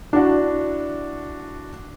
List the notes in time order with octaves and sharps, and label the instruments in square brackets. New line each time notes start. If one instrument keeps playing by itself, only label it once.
[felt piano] D4 E4 F#4